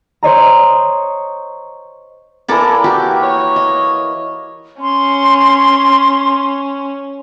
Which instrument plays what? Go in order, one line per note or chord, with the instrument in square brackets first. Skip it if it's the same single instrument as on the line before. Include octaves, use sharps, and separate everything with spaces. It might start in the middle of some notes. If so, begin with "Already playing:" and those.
[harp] C5 C#5 D#5 A#5
[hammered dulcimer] E3 A#3 [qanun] A4 D5 A#5
[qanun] F#4 G4
[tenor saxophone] C#5
[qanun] D#5
[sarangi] C#4 [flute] C6